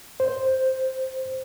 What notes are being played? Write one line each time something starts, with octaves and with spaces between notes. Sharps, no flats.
C5